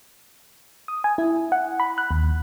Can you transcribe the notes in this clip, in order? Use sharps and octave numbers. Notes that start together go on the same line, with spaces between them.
D#6
G#5
E4
F#5
B5
F#6
D#2